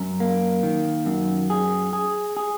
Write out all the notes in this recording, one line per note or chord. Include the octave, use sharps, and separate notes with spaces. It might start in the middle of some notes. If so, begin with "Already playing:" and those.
Already playing: F#2
A#3
D#3
F#2
G#4
G#4
G#4